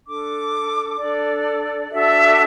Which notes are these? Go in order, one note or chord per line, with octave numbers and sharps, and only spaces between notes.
D4 A4 D6
D4 A4 D5
D4 F#4 A4 E5